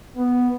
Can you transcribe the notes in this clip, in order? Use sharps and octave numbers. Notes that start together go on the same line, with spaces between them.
B3